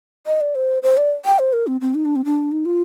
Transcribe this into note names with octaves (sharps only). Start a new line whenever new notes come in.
D#5
D5
C5
C5
D5
G5
C5
A#4
C4
C4
D#4
D4
C4
D4
D#4
F4